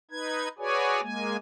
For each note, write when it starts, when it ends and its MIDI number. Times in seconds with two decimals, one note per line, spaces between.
0.11 0.48 63
0.11 0.48 71
0.11 0.48 92
0.59 1.01 66
0.59 1.01 68
0.59 1.01 71
0.59 1.01 73
0.59 1.01 74
0.59 1.01 80
1.02 1.37 56
1.02 1.37 58
1.02 1.37 80